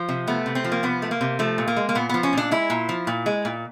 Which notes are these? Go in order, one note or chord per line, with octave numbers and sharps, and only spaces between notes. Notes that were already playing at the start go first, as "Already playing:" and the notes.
Already playing: F3
C3
A3 B3
C3
C4
F3
A#3
C3 B3
A3
A#3
C3
F3 A3
A#2
A#3
G#3
A#3
A#2 B3
F3 B3
C#4
A#2 D4
G#3 E4
A#2
F3
A#2
G#3
A#2